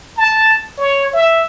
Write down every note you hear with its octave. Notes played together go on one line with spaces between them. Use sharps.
A5
C#5
E5